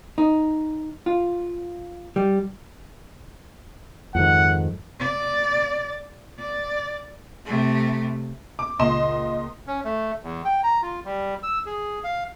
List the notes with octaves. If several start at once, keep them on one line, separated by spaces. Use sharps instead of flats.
D#4
F4
G3
F2 G#2 D#3 F#5
D5
D5
C3 A3
D6
C#2 A#2 D#5 C6 E7
C#4
A3
E2
G5
A#5
F4
G3
E6
G#4
F5